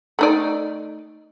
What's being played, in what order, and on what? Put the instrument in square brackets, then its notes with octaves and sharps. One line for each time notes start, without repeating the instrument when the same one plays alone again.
[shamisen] A3 D#4 D5